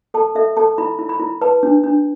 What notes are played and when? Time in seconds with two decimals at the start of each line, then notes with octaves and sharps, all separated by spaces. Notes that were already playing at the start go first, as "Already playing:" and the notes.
0.14 A4 A5
0.35 A4 E5
0.57 A4 A5
0.78 E4 B5
0.99 E4
1.09 B5
1.20 E4
1.41 B4 A5
1.63 D4
1.84 D4